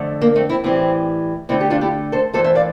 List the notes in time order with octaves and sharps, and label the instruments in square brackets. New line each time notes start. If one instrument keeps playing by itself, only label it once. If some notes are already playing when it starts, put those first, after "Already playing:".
Already playing: [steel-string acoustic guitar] F2 D3 A3
A#3
A3 C4
C4 E4
A2 E3 G3 C4 E4
D2 D3 A3 C4 E4
G4
D4 F4
E4 G4
A4 C5
G2 E3 A3 A4 C5
C5 E5
D5 F5